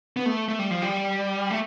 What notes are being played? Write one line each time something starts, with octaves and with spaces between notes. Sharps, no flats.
B3
A3
A3
G3
F3
G3
A3